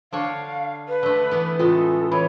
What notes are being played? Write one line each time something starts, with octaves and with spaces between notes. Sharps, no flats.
D3 D4 C#5 F5
B4
D3 A3
E3 B3
A2 C#3 G#3 F4 A4
E3 C#5 B5